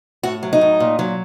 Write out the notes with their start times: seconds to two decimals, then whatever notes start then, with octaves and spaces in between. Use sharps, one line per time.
0.23 A2 F#4
0.43 F#3
0.53 D#4
0.61 A2
0.80 A#2
0.99 F#3